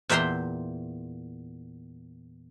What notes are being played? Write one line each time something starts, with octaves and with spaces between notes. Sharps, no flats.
E2 A#2 E5 G5 A#5 C6